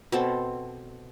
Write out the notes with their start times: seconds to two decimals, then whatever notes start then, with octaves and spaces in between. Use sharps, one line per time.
0.12 B2 C4 A4